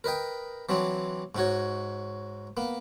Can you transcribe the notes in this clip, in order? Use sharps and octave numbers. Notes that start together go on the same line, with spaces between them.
A#4 B4 D#5 G5
E3 F#3 C4 D4
G#2 D#4 F#4 C#5
A#3 B3